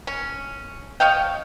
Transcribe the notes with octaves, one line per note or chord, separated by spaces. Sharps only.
C#4
C#5 D#5 F5 G5